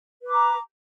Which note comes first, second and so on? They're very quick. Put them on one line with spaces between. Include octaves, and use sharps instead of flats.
B4 D6 A#5